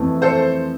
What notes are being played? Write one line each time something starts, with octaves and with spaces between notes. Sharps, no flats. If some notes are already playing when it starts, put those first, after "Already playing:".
Already playing: F2 E3 A3
A4 C5